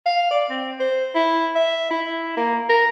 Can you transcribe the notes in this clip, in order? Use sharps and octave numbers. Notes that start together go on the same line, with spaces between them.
F5
D5
C4
C5
E4
E5
E4
A#3
A#4